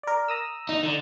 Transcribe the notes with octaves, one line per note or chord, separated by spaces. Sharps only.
A#4 D5
A#5 D#6 E6
D#4
D3